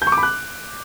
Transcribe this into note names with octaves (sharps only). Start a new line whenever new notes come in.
G6
C#6
D6
B5
F#6